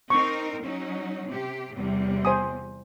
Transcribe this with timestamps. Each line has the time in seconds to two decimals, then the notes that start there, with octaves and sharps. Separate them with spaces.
0.10 C4 D#4 A#4 C#6
0.63 F#3 C#4 D#4
1.28 C3 G4
1.76 E2 C3 G3
2.25 C5 G#5 D#6